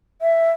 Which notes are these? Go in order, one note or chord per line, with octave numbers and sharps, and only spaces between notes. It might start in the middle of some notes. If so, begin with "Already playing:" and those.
E5